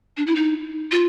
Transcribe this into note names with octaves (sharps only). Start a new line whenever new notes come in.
D4
E4
D#4
F4